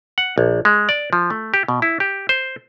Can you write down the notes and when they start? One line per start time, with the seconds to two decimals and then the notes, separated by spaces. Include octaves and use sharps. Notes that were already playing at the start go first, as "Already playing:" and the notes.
0.18 F#5
0.38 A#1
0.65 G#3
0.89 D5
1.13 F3
1.30 A3
1.54 G4
1.68 B2
1.82 E4
2.00 G4
2.29 C5